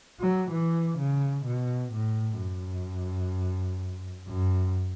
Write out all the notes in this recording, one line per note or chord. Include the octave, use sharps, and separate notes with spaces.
F#3
E3
C#3
B2
A2
F#2
F#2